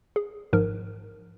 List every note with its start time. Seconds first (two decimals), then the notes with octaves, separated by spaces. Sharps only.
0.16 G#4
0.53 G#1 G#2 F3 A#4